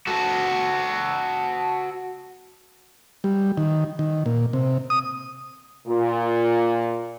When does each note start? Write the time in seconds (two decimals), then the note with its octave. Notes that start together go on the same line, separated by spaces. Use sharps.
0.07 F#4 A4
3.24 G3
3.57 D#3
3.99 D#3
4.26 A#2
4.53 C3
4.90 D#6
5.87 A#2